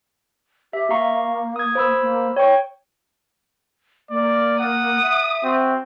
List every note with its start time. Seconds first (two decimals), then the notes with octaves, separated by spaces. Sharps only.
0.73 G4 E5
0.90 A#3 F5 A#5 C#6
1.56 D#6 G#6
1.75 C5 B5 E6
2.02 A#3
2.37 C#5 G5 C#6
4.11 A#3 D5
4.60 F#5 D#6
5.03 E5
5.44 C4 F#4